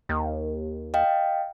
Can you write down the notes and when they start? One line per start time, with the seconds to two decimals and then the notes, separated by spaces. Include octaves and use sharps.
0.09 D#2
0.94 D#5 F5 G5